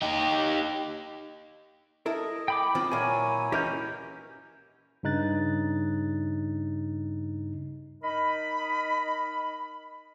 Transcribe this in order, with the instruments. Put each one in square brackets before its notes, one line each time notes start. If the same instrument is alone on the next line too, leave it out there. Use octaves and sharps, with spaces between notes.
[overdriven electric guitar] D#4 G4
[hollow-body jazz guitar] E4 A4 A#4 [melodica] D#5
[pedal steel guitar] G5 B5 D6
[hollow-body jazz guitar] D#3 C4 F4
[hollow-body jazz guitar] A#2 A#3 [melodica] F#3 E4 C#5 [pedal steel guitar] G#5
[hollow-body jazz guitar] E3 C#4 D#4 [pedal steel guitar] G4 A#4 G6
[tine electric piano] G2 C#3 D#4 F#6 A6
[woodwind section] D#4 A#4 D#5 B5